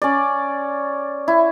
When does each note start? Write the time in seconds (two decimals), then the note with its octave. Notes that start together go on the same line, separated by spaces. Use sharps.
0.02 C#4 D5
1.28 E4